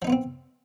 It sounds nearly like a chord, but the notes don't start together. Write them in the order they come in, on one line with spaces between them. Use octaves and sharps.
F3 D#4 B3 F4 C4